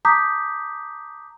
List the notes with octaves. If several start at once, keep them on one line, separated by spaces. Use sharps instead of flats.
A5 A#5 D6 D#6 G6 B6